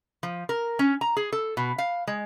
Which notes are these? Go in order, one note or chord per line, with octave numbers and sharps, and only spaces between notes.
F3
A#4
C#4
A#5
G#4
A4
B2
F5
G#3